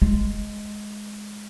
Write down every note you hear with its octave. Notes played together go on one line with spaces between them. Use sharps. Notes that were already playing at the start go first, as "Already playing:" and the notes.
G#3